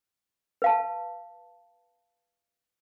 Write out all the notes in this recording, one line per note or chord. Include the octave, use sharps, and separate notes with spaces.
B4 F5 A5